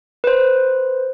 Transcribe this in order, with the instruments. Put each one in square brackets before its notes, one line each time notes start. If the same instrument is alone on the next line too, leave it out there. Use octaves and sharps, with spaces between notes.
[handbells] B4 C5